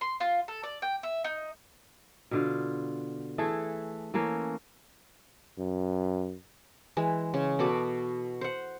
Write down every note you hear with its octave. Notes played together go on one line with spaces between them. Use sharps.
C6
F4
A4
D5
G5
E5
D#4
B2 D3 F4
E3 A3 G#4 A4
E3 A3 A#3 C#4
F#2
E3 G#3
C#3
B2 A4 B5 D6
C5 F#5